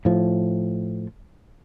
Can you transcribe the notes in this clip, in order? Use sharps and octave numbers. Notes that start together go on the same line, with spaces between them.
A2 F3